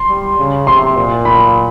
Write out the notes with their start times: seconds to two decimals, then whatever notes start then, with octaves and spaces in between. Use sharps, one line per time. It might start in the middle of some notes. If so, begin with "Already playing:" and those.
Already playing: C6
0.09 G3
0.38 C#3
0.67 C3 C6
0.96 A#2
1.25 B5